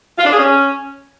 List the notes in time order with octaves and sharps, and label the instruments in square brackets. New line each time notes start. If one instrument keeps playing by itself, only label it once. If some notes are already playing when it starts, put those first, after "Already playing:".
[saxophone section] F4
D4
G#4
C#4